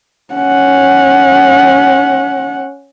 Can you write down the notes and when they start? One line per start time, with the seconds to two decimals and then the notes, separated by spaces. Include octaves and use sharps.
0.34 C#4 F#5